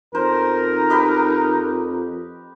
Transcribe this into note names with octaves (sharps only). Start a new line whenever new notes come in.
F2 D#4 A#4 C5
G4 B4 D#5